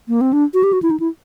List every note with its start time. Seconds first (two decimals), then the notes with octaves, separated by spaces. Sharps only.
0.08 A#3
0.21 C4
0.33 D4
0.54 F#4
0.63 G4
0.73 F#4
0.82 E4
0.91 D#4
1.00 E4